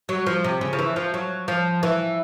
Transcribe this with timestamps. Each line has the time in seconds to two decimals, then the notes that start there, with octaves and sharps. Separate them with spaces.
0.09 F#3
0.26 F3
0.44 C3
0.61 C#3
0.73 F3
0.79 E3
0.96 F3
1.14 F#3
1.48 F3
1.83 E3